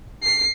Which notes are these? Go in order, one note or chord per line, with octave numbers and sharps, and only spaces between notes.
C7